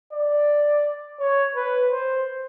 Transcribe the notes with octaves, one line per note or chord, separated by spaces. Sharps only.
D5
C#5
B4
C5